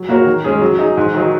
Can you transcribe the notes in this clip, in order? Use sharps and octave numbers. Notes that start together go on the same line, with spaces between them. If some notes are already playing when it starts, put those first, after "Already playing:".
Already playing: F#3
A#3 F#4 A#4 C#5
D#3
G#3 C#4 G#4
F#3
D#4 G#4
G#2
D#3 F#3 D#4